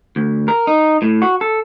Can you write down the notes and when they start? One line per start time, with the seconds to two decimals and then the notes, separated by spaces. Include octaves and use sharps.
0.16 D2
0.48 A#4
0.67 D#4
1.02 A2
1.22 F#4
1.41 A4